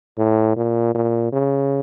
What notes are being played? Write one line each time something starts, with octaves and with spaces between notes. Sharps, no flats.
A2
A#2
A#2
C#3